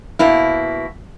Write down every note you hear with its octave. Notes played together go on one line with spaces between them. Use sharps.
B2 A#3 E4